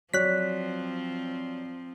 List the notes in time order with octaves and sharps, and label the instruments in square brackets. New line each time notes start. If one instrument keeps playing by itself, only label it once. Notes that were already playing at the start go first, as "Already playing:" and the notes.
[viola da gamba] F3 C4 [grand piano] F#3 C#5 D5 [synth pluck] F#6 B6